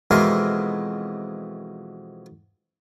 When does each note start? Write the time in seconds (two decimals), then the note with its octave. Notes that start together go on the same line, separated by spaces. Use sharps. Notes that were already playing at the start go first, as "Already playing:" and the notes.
0.11 F2 B2 E3 G#3 A#4 C6